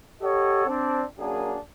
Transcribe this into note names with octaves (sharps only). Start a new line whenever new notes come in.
G4 A4 C#5 D#5 F#5
C4 D4
F#2 A#3 D4 G#4